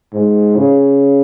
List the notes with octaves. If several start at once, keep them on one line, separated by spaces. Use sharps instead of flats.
G#2
C#3